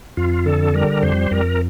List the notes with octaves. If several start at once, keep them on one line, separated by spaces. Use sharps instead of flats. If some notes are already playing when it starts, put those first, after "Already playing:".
F2 F4
D3 A4
G3 A#4
F2 C5
F2 A#4